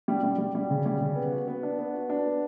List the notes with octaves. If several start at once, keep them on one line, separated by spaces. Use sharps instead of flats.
G3
G3
G3
G3
C#3
G3
C#3
B3
F#4
B3
D4
B3
F#4
D4
B3